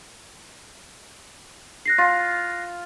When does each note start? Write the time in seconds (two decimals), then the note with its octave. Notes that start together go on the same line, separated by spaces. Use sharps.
1.86 F#6 A#6 C7
1.98 F4